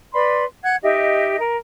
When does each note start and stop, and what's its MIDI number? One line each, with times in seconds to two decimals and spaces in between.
0.13 0.44 71
0.13 0.44 74
0.13 0.44 83
0.13 0.44 84
0.63 0.75 78
0.63 0.75 90
0.63 0.75 92
0.83 1.38 63
0.83 1.38 67
0.83 1.38 75
0.83 1.38 76
1.38 1.57 70